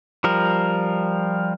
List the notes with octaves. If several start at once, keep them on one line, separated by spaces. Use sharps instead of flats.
F3 G3 A#4